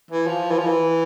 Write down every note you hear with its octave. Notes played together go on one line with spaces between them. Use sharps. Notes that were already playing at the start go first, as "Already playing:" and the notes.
E3
F3
E3
F3
E3